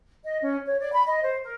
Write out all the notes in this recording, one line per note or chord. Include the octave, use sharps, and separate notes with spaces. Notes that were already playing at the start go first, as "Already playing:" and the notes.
D#5
C#4
C#5
D5
B5
D#5
C5
A#4